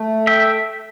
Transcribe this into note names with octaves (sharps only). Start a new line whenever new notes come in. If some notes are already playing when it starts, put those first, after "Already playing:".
Already playing: A3
E5 G5